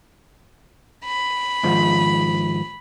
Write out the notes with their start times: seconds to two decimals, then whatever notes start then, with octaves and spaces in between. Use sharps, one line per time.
1.05 B5
1.63 G#2 D#3 F3